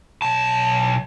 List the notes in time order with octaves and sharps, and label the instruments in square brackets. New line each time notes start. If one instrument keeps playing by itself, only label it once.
[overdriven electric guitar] B1 A5